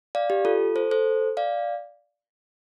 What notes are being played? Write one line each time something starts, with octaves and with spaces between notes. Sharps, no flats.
D5 F5
G4
F4 A4
A4 C5
A4 C5
D5 F5